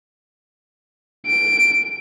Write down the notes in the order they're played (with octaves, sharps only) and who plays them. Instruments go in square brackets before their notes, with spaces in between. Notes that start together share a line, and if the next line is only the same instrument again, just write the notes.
[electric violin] D7